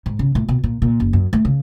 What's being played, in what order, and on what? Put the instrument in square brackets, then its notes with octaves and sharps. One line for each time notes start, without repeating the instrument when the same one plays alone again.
[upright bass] G#2
C#3
A2
B2
A#2
A#2
F#1
F#2
A3
C#3